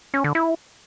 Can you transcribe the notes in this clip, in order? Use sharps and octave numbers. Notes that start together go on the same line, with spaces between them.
C#4
D3
E4